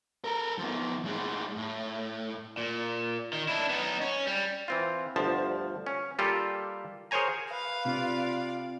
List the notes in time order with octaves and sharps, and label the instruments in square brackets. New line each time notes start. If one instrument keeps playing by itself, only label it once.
[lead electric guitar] A4 A#4
F3 B3
A2 G#3
A2
[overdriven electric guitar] A#2
D#3
D4 E4
B3 D#4
C#4
G3
[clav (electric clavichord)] E3 C4 F4
G1 D2 F3 A5
C#4
G3 A#3 F4 G4 A4
G#4 A#4 C5 C#5 G#5 A#5
[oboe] B4 [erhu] F5
[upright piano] C3 [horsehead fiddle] F4 D5